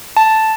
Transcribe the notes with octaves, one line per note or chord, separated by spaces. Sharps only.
A5